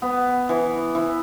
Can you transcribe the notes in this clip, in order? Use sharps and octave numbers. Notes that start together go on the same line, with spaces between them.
B3
E3
E3